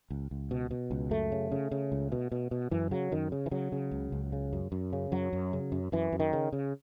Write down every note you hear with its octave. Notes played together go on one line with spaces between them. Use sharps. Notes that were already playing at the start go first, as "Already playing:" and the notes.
C#2
C#2
B2
B2
C#2
F#2 A3
C#3
C#3
C#3
C#2
B2
B2
B2
F#2 E3
C#3 F#3
F#2 D#3
C#3
E3
C#3 F#3
C#3
C#2
C#2
C#3
F#2
F#2
C#3
F#2 F#3
F#2
C#3
F#2
F#2 E3
F#2
D#3
C#3
C#3